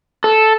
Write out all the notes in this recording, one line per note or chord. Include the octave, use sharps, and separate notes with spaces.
A4